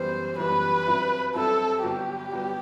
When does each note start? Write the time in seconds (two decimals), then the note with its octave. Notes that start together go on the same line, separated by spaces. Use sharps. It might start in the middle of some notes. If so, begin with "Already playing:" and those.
Already playing: F#2 E3 G3 B3 C5
0.38 F#2 E3 G3 B3 B4
0.87 G2 F#3 C4 E4
1.34 G2 F#3 C4 E4 A4
1.83 G1 G2 F#3 B3 F#4 G4
2.31 G1 G2 F#3 B3 F#4